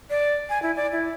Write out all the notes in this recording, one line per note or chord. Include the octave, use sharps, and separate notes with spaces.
D5
G#5
E4
D5
E4